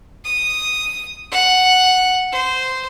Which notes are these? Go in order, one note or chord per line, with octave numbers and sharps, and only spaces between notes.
D#6
F#5
C5